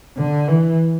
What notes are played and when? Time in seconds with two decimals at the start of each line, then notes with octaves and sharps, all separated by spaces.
0.17 D3
0.48 E3